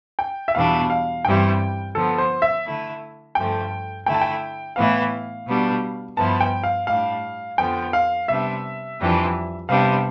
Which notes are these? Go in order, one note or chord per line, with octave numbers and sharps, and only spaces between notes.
G5
E5
E2 B2 G3 D4 F5
F5
G2 E3 G3 C4 E4 G5
D3 F3 B3 A4
C5
E5
D3 A3 E4
G2 D3 F3 A3 G5
D3 A3 E4 G5
A5
G5
A2 E3 B3 E4 F5
B2 G3 B3 D4
G2 F3 B3 E4 A5
G5
F5
A2 G3 D4 F5
F2 D3 F3 B3 G5
F5
C3 G3 B3 D4 E5
F2 E3 G3 D4
C3 G3 B3 D4 F5